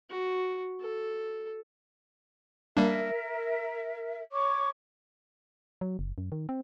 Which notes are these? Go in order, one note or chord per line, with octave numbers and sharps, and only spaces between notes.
F#4
A4
G3 A#3 D4 A#4 E5
C#5 C#6 D6
F#3
F#1
F#2
D#3
C4